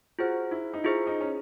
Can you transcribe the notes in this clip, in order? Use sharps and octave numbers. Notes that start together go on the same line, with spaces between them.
F4 F#4 G#4 C5
E4
D#4
E4 F4 G#4 C5
D#4
C#4